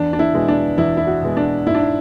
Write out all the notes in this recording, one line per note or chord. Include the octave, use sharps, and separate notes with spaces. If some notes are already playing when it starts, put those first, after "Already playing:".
Already playing: E2 D4
D4
E4
B2 G#3 B3
D4
E2 E4
E4
F#4
B2 G#3 B3
D4
G#2 E4
D4